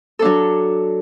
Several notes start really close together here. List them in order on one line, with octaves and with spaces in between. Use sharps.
A4 D4 F#3